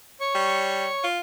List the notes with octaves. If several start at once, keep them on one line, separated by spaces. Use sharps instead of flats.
C#5 C#6
G3
F4